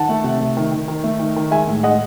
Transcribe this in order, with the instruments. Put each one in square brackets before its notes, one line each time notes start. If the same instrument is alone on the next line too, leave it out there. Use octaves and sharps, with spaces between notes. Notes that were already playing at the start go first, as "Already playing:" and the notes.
Already playing: [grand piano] D#3 F#5 A5
A3
C3
A3
D#3
D#3
D#3
A3
D#3
D#3
G#3 E5 G#5
A2
G#3 D#5 F#5